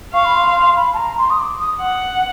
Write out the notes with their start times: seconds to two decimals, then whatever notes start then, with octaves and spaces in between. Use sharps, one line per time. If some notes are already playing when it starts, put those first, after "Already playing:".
0.13 F5 C#6
0.25 B5
0.35 C6
0.55 C6
0.76 B5
0.93 A5
0.97 A#5
1.18 C6
1.30 D#6
1.39 D6
1.60 D#6
1.81 F#5